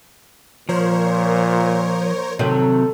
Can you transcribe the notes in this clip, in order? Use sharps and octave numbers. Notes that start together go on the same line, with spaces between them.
A#2 F3 A#4 C5 C#5
C3 D#3 F#3 A4